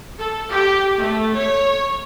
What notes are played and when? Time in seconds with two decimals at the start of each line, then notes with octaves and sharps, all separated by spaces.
0.18 A4
0.51 G4
0.96 A3
1.34 C#5